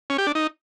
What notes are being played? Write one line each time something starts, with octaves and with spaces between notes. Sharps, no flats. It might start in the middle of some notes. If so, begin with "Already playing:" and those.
C#4
G4
D4
D#4